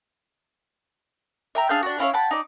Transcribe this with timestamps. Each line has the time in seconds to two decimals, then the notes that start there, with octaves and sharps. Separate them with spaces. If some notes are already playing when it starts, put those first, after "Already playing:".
1.55 E5 G5 A#5
1.69 D4 G#4 F5 G6
1.83 D4 F#4
1.99 C#4 E4 F4 C#5
2.13 F#5 G5 A5 B5
2.31 D#4 D5